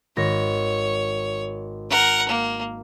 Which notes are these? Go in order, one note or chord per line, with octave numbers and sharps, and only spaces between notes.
G#1 C#5 A#6
A#4 F#5
A#3